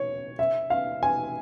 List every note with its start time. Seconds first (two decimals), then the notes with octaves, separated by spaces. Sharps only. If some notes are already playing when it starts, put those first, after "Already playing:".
Already playing: C#5
0.39 E5
0.70 F5
1.03 G#5